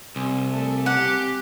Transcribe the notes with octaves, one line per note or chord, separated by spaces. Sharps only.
C2 C4 G#5
A3
G4 F#5